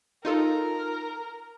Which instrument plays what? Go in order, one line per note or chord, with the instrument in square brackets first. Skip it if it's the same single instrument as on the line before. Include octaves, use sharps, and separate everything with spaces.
[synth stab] D#4 F4 A4 [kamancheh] A#4